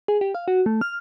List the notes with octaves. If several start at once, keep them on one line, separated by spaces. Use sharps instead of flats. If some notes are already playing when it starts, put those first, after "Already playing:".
G#4
G4
F5
F#4
A3
F6